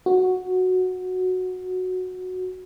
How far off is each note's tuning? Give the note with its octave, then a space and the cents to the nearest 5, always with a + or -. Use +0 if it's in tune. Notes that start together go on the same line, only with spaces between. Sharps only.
F#4 -5